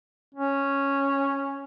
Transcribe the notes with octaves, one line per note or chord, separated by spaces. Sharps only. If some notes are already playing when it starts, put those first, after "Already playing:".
C#4